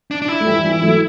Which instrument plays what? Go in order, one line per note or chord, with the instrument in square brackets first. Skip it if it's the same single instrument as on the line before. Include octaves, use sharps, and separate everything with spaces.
[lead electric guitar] D4
D4
E4
[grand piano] A3
E3 G3
E3 G3
F#3 A3